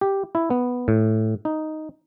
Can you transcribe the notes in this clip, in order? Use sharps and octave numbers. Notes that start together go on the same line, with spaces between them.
G4
E4
B3
A2
D#4